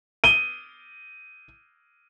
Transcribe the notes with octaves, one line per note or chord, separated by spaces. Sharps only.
D#7 G7